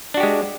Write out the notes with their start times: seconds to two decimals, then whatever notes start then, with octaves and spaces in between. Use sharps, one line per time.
0.14 D4
0.17 F#4
0.20 G4
0.23 G#3